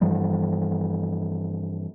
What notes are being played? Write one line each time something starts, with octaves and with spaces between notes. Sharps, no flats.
G2 E3 F3 G3